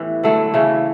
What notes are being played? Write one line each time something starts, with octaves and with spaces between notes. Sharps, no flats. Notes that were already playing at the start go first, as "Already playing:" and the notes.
Already playing: A2 E3 B3 G4
D3 F#3 A3 E4
C#3 E3 A3 C#4